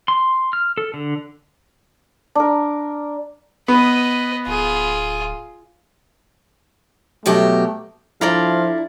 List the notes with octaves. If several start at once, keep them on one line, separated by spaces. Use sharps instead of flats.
C6
F6
A4
D3
D4 A#4
B3 B4 D#5
D1 F4 G#4
B2 F#3 A3 G4
F3 D4 E4 A4 D5 F5 A#5